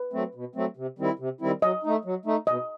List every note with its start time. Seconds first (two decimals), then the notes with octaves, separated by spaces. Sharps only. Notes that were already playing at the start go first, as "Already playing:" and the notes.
Already playing: B4
0.13 F#3 A3 C4
0.35 B2
0.55 F#3 A3 C4
0.77 C3
0.99 D#3 G3 C4 E4
1.19 C3
1.41 D#3 G3 C4 E4
1.62 F#3 D#5
1.83 A3 D#4
2.05 F#3
2.25 A3 D#4
2.47 B2 D#5